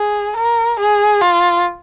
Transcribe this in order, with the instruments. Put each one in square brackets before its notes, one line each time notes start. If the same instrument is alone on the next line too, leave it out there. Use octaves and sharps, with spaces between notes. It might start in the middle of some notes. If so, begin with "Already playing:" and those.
Already playing: [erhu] G#4
A#4
G#4
F4